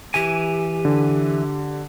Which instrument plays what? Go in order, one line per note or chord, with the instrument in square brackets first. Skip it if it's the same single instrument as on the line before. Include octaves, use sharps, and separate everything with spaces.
[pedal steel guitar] E3 G#5 [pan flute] G4
[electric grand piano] D3